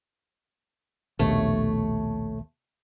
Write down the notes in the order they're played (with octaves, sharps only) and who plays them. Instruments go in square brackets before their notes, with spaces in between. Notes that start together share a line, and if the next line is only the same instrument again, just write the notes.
[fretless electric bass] A#1 D#2 B2 [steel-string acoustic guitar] A3 C#5